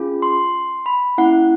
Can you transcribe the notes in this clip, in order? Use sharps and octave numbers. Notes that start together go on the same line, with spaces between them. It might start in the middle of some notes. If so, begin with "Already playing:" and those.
Already playing: C#4 F4 G#4
C6
B5
A#3 C#4 E4 F#5